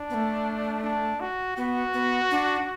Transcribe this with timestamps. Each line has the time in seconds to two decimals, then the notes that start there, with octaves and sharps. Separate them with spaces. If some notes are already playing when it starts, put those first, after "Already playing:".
Already playing: D4
0.10 B3
0.14 A3
0.83 D4
1.20 F#4
1.57 B3 F#4
1.94 B3
2.31 D4